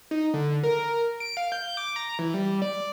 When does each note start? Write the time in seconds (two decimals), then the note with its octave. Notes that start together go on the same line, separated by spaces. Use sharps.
0.11 D#4
0.34 D3
0.63 A#4
1.20 D7
1.37 F5
1.52 G6
1.77 D6
1.96 A#5
2.19 E3
2.34 G3
2.62 D5